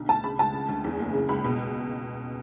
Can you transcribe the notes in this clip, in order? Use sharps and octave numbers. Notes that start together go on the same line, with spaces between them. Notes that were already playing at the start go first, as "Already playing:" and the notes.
Already playing: B1 D3
D2 A5
C#3 B5
C#2 A5
C#3
D2
E2
F#1
C#3
C#2 B5
B2